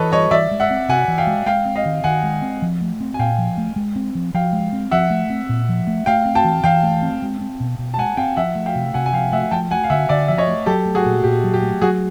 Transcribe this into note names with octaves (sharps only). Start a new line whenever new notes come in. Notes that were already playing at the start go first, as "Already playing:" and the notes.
Already playing: E3 A4 B4 C#5 D#5
G3 C#5 D#5
E3 D5 E5
G#3
E5 F#5
C4
C3 F#5 G#5
E3
F5 G5
G#3
G#3 F5 G5
C4
D#5 F5
D#3
D#3 F#5 G#5
G#3
C4
F3
A3
C4
G#5
A#2 F5 G5
F3
A3
G#3
C4
F3
F3 F5 G5
G#3
C4
F3 E5 F#5
A3
C4
A#2
F3
A3
A3 F5 G5
C4
G5 A5
E3
E3 F5 G5
A3
C4
G#3
C4
B2
B2
A5
G#3 F#5 G#5
C4 F5 G5
F3 E5 F#5
A3
F5 G5
C3
C3 F#5 G#5
G#5
F3 F5 G5
A3 E5 F#5
F3 G5 A5
A3 F#5 G#5
F5
D3 E5 F#5
D3 D5 E5
F3 E5
C#5 D#5
A3
F#3 G4 A4
A3
F#4 G#4
A#2
A#2 G4
F#3
G4
A3
F#3 F#4 G#4